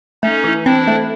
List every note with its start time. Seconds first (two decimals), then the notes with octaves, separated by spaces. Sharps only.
0.23 A3 C#4 D#4
0.44 E3
0.66 C4 D4 E4
0.87 A3